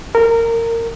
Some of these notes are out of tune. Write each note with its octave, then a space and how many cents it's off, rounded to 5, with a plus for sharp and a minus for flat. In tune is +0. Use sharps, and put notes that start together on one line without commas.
A#4 -20